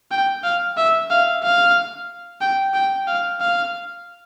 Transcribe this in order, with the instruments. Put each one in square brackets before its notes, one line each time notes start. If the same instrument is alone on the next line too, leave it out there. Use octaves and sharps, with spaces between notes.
[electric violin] G5
F5
E5
F5
F5
G5
G5
F5
F5